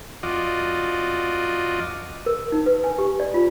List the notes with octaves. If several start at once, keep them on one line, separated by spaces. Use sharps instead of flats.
F2 F4 F#4 D5 D#5
A#4
D#4
B4
G#5
G4
D5
F4